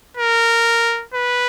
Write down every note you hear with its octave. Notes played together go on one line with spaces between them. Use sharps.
A#4
B4